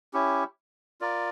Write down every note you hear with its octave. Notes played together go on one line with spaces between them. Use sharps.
C#4 E4 G4
F4 A#4 D5